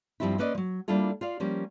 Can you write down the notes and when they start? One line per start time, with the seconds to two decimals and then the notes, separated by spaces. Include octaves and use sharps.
0.20 G2 E3 F3 G3 C4 E4
0.38 A#3 C#4 B4 D5 D#5
0.55 F3 F#3
0.88 G3 A#3 D4 E4 F4 A4
1.21 F4 D5 F5
1.40 F3 G3 A#3 C#4